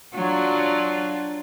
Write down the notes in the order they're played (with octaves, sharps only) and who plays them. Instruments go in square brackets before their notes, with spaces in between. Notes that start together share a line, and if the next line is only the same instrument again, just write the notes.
[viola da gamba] F#3 D4 F4